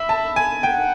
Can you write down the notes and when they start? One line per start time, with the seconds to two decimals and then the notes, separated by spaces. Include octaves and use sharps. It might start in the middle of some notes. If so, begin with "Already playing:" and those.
Already playing: E5 B5
0.09 A5
0.36 G#5
0.63 F#5 G5